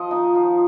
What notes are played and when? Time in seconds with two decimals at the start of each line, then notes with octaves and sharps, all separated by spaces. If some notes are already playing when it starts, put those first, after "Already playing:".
Already playing: F3 D#5
0.11 D#4
0.35 F3